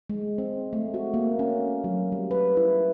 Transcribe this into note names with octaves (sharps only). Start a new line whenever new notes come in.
G#3
C4
A3
F#4
A#3
C#4
F#3
G3
B4
E4